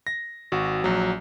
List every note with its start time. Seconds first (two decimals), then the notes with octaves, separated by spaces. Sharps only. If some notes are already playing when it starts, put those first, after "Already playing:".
0.07 A#6
0.52 G#1 F#4
0.84 A#1 F#3